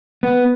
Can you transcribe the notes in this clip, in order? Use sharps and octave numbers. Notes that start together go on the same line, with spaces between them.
B3